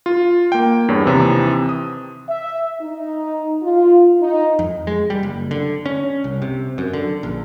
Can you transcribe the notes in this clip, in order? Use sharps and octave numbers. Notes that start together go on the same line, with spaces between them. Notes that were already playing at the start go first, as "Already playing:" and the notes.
F4
A#3 G5
E2 G2 C#5
D#2 C3 E3
D#6
E5
D#4
F4
D#4
F2
G#3
G3
F#1
D3
C#4
C2
C3
F#2
D3
A#1